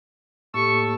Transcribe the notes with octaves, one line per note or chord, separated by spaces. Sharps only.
A2 A#3 G4 A4 A5 C#6 E6
A#3